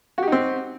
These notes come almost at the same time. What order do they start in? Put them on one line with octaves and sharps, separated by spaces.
F#4 G4 D#4 C4